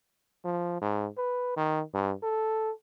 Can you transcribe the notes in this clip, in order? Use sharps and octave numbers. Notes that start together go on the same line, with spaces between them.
F3
G#2
B4
D#3
G2
A4